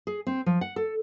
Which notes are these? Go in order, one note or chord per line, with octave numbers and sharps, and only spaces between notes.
G#4
C4
F3
F#5
A4